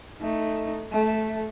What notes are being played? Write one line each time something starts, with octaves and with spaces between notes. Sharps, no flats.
A3 D#4
A3